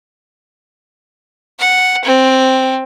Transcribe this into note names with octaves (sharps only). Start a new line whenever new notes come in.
F#5
C4